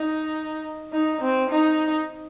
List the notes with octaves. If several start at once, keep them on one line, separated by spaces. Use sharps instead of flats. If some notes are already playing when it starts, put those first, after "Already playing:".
Already playing: D#4
D#4
C4
D#4